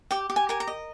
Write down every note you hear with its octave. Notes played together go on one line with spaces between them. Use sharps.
G4 G5
G4
G#5
A#4 G#5
A#5
D#5